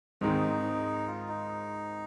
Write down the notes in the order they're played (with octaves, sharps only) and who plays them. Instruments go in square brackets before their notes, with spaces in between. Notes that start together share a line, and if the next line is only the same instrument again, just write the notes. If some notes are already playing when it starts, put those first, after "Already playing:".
[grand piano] G#2 D#3 G#3 C4 [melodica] D#4
[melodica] F4
D#4